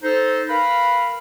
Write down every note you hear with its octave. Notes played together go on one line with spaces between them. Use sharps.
D#4 A4 C5
A#4 B4 F5 B5